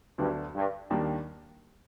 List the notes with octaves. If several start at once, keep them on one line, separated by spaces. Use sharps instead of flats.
D2 G2 D3 F#3 B3 D4
G2
D#2 D#3 G3 A#3 D4